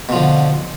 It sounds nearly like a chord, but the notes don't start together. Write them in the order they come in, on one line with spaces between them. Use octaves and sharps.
B2 F3 D3